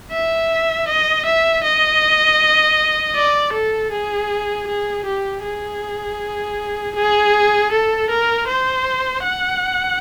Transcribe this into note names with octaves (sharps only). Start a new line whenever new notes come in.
E5
D#5
E5
D#5
D5
A4
G#4
G#4
G4
G#4
G#4
A4
A#4
C5
F#5